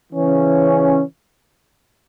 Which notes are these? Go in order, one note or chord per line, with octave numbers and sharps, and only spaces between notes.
C#3 E3 C#4